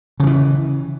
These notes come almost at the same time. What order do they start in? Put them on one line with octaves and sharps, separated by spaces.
C#3 F3 E3